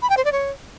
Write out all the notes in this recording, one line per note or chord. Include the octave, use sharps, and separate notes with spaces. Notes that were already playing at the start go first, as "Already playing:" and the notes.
B5
G5
C5
D5
C#5